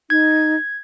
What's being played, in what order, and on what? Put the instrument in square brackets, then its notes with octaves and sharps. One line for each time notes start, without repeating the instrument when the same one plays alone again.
[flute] D#4 [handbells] G#6